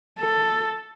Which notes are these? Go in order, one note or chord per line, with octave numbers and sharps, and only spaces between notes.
A4